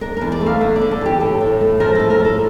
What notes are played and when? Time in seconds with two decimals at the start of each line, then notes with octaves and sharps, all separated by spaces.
0.01 D4 A#4
0.17 E2 A#4
0.32 D5
0.41 A3
0.46 F5
0.61 D3 E5
0.76 D5
0.81 D4
0.91 A4
1.01 E2 G4
1.20 A2 A4
1.41 A2
1.61 A3
1.80 F3 A#4
1.95 A2 A4
2.10 A#4
2.19 A2
2.25 A4